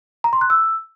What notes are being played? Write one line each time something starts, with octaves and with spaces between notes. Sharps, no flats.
A#5
C6
F#6
E6